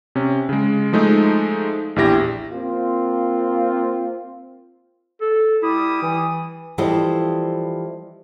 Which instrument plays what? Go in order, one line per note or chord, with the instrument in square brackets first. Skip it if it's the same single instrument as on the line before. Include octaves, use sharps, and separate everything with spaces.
[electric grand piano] C3 C#4
C#3 G#3
F3 G#3 A3 D#4
A#1 E2 E4 G4 A#6
[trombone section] A#3 C4 F4
[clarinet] A4
[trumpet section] G3 D6 D#6 [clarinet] E4
[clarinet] E3
[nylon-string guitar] E3 F3 G3 A4 C5 D#5